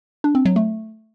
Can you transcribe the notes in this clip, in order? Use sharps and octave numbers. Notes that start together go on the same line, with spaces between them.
D4
C4
F#3
A3